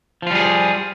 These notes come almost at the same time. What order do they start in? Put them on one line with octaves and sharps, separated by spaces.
F3 F4 G3 G#4